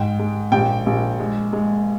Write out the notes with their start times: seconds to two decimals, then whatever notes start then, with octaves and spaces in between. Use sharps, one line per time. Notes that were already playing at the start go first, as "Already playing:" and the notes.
Already playing: G#2 G5
0.19 G#3
0.52 A#1 G5
0.86 A#1
1.19 G#3
1.53 G#3